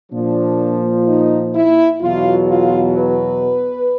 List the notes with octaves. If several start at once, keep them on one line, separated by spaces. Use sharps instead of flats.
A#2 F3 D4
D#4
E4
E2 B2 F#3 F4
F4
B4